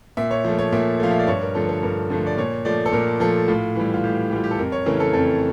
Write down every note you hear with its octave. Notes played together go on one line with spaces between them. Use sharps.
A#2 E5
C#5
F3 A3
C#5
A#2 E5
F3 A3 F5
E5
D5
G2 C#5
A#4
D3 F3 A3 A4
A4
G2 A#4
D3 F3 A3
D5
A#2 C#5
F3 A3 D5
A4
A#2 A#4
F3 A3 A4
A2 F4
E3 G3
F4
A2 G4
E3 G3 F4
G4
A4
F2 A#4
C#5
C#3 E3 A3 A#4
A4
F2 A4